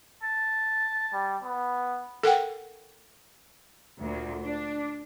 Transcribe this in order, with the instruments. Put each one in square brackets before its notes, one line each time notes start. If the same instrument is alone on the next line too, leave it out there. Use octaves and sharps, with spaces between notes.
[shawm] A5
[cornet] G3
B3
[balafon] A4 A#4 F#5 G5
[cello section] D2 A#2
D4